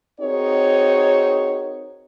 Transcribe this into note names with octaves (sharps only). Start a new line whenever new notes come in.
C4 D#4 F#4 G#4 A#4 C#5